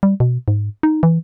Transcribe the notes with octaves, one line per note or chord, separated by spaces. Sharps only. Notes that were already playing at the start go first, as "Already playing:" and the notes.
G3
B2
G#2
D#4
E3